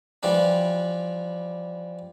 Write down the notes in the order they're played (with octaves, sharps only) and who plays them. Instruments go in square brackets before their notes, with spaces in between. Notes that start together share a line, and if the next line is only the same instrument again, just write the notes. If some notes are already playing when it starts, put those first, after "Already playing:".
[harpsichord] E3 F3 G3 D4